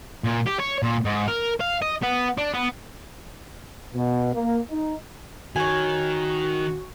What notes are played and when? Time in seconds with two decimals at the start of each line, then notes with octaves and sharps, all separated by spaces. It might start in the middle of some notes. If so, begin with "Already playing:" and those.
0.24 A#2
0.46 G4
0.59 C#5
0.82 A#2
1.05 G#2
1.28 A#4
1.60 F5
1.82 D#5
2.02 B3
2.38 D4
2.54 B3
3.95 B2
4.35 A#3
4.70 D#4
5.56 D#3 F#4 C#5 G#5